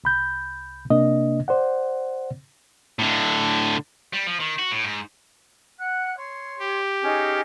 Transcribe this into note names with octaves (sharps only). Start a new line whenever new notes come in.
C2 B5 G6
C3 A#3 D4 D#5
C5 D5 F#5
A2 D3
G3
F3
D#3
F#4
A2
G#2
F#5 F#6
C#5 C6
G4
C#4 D#4 G#4